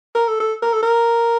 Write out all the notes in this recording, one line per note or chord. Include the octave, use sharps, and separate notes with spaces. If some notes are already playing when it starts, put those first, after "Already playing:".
A#4
A4
A4
A#4
A4
A#4